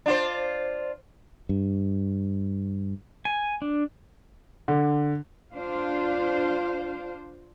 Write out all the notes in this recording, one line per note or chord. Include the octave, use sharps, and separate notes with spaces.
D4 F4 C5
G2
G#5
D4
D3
D4 F4 C5 F5